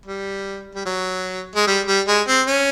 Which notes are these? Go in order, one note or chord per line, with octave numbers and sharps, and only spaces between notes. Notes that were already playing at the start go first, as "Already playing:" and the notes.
G3
G3
F#3
G#3
G3
G3
G#3
C4
C#4